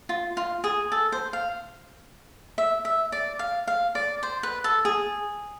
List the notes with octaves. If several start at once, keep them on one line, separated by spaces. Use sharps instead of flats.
F4
F4
G#4
A4
C5
F5
E5
E5
D5
F5
F5
D5
C5
B4
A4
G#4